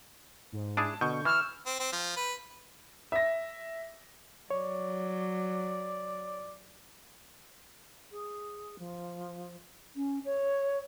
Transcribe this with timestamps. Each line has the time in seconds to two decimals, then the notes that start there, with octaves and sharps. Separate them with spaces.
0.52 G#2
0.77 D4 E4 G#4 A5
1.01 B2 D3 C#6 G6
1.25 E3 E6 F6
1.66 C4
1.80 C4
1.93 F3
2.17 B4
3.12 E5 A#6
4.51 F#3 C#5 D5
8.12 G#4
8.79 F3
9.96 C#4
10.25 C#5